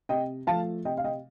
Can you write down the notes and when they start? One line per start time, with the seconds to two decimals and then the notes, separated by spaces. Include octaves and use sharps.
0.09 C3 D#5 G5
0.47 F3 A3 F5 A5
0.85 C3 D#5 G5
0.98 F5
1.04 D#5 G5